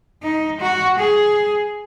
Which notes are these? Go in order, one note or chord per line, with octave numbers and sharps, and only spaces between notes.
D#4
F#4
G#4